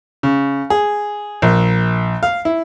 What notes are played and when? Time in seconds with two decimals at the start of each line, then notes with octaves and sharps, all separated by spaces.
0.23 C#3
0.70 G#4
1.42 A#1
2.23 F5
2.45 E4